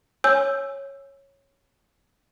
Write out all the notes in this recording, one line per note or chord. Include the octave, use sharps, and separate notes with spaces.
C#5 G#5 E6 G6